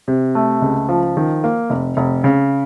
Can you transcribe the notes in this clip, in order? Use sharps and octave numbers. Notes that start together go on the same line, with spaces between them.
C3
A3
C#2
F3
D#3
A#3
F1
F1
C#3